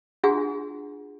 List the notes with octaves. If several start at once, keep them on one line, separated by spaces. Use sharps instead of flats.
D4 F4 F#4 G#4 F#5 G#5